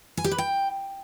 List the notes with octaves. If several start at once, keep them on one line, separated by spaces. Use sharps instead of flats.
G#5
G4
B4
G5